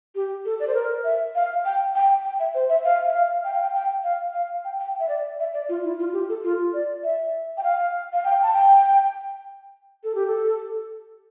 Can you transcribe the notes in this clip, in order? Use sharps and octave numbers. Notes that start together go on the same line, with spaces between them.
G4
A4
D5
C5
A#4
E5
F5
G5
G5
G5
E5
C5
E5
F5
E5
F5
G5
F5
G5
G5
F5
F5
G5
G5
E5
D5
E5
D5
F4
E4
F4
G4
A4
F4
D5
E5
G5
F5
F5
G5
A5
G5
A4
G4
A4